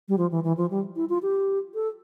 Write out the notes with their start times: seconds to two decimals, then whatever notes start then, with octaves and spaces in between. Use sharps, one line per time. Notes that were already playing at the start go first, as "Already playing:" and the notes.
0.08 G3
0.18 F3
0.31 E3
0.44 E3
0.57 F3
0.70 G3
0.96 E4
1.09 F4
1.22 G4
1.75 A4